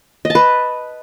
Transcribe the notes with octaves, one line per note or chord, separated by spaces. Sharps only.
D#5
A5
B4